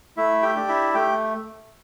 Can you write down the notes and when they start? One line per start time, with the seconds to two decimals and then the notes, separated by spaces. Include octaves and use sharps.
0.17 A3 E4 E5
0.42 G4 G5
0.55 D4 G4
0.68 E4 E5
0.94 A3 G4 G5